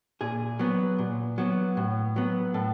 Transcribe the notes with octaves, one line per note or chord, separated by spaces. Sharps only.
A#2 G#4
F#3 B3
A#2
F#3 B3
A2
F#3 B3
A2 A4